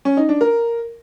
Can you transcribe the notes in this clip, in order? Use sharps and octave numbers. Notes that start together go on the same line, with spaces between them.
C#4
D#4
D4
A#4